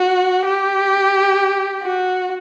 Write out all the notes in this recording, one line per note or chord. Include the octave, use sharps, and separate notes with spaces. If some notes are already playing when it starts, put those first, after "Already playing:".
Already playing: F#4
G4
F#4